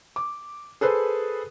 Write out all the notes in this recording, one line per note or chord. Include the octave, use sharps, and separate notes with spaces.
D6
G#4 A4 B4 C5